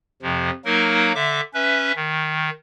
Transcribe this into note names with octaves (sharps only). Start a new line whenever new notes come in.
F2 C3 F3
F#3 A#3 D#4 A#4
D3 E5 D6
C#4 B4 E5
D#3